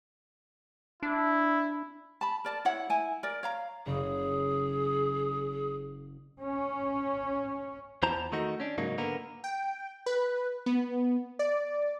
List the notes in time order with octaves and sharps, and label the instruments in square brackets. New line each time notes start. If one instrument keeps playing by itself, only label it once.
[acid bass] D4 [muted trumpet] E4
[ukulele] A5 B5
A#4 D5 A5
E4 C#5 F#5
E4 G#5
A#4 D5
C#5 F5 A#5
[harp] F#1 C#3 [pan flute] G#4
[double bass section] C#4
[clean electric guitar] E2 E4 C5 A5 A#5
D#3 A3 D#4 F#4
C#4 D4
G#2 C#3 F#3 A#3 D#4
D3 A#3 B3 A#4
[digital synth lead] G5
B4
B3
D5